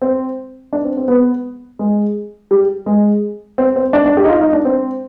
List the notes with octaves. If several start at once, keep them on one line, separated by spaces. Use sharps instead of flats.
C4
D4
C4
C4
B3
G#3
G3
G#3
C4
C4
D4
D4
G4
D#4
F4
D#4
D4
C4